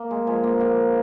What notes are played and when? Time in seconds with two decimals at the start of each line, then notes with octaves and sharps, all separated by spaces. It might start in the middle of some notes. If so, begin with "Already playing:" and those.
Already playing: A#3
0.11 G#3
0.27 F3 G#3
0.44 A#3
0.60 A#2 A#3